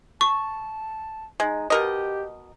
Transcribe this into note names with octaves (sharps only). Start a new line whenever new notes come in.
A5 C#6
G#3 D#4
B2 G4 A#4 D#5